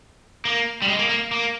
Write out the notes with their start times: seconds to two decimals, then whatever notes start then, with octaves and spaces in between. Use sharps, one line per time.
0.45 A#3
0.82 G3
0.88 G#3
0.99 A#3
1.09 A#3
1.31 A#3